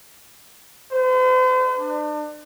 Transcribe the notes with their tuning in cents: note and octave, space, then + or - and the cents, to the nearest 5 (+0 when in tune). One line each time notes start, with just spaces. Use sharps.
C5 -45
D4 +35